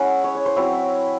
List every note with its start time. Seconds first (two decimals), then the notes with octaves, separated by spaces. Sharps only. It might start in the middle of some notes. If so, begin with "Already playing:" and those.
Already playing: G#3 C#4 E4 F#5 G#5
0.24 C#5
0.35 C#5
0.46 C5
0.56 F#3 C4 E4 C#5